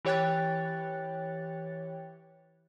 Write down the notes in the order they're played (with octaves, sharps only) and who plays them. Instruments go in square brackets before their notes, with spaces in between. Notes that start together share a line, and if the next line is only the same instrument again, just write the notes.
[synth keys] E3 G4 C#5 G5 F#6 A6